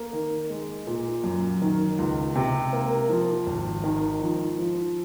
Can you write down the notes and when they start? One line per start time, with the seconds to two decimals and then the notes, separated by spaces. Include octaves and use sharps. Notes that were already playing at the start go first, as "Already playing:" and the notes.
Already playing: A#3
0.13 D#3
0.50 G#3
0.87 A#2
1.24 F#2
1.61 D#3
1.98 C#2
2.36 C3
2.73 A#3
3.09 F3
3.46 G#1
3.84 D#3
4.21 F3
4.58 F3